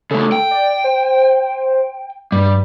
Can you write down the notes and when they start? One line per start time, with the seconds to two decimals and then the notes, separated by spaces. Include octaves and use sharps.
0.11 C#3 A3 A4
0.32 G5
0.51 D5
0.84 C5
2.32 G2 G3